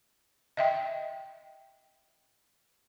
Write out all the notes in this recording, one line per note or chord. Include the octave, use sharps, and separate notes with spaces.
D#5 E5 G5